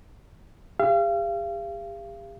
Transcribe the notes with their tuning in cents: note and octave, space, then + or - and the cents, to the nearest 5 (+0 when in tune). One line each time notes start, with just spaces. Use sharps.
G4 +45 F5 -35